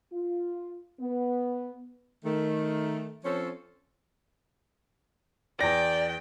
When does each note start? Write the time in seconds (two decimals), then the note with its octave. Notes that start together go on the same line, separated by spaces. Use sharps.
0.13 F4
1.00 B3
2.25 D#3 A3
3.24 F3 C4 C#4 A4 C5 C#5
5.61 E2 D5 G5 A#6